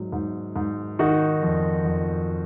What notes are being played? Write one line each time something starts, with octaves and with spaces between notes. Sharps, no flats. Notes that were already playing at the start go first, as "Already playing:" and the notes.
Already playing: G#2 F#3
G#2
G#2
D#3 D#4 F#4
F2
F2